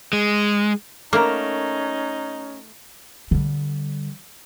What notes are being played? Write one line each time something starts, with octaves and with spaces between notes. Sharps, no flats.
G#3
A3 A#3 C#4 D#4 A#4
D3 G3